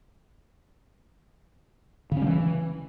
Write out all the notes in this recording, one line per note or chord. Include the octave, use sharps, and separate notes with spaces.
C#3
C#4
G3
E3